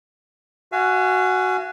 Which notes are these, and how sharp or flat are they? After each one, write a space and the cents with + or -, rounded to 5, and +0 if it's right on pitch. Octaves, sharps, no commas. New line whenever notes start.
F#4 +0 F5 -40 G#5 +10